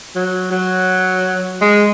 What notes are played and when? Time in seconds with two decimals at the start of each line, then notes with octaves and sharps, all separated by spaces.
0.15 F#3
0.52 F#3
1.61 G#3